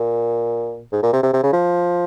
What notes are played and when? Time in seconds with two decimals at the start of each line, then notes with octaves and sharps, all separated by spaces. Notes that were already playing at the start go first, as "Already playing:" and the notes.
Already playing: A#2
0.92 G#2
1.03 A#2
1.13 C3
1.23 C3
1.33 C3
1.43 C#3
1.53 F3